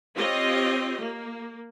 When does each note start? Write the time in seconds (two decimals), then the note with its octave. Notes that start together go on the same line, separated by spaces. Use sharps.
0.16 C4 F4 G4 C#5 D#5
1.01 A#3